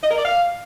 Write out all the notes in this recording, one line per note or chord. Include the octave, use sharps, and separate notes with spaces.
D#5
A#4
D5
F5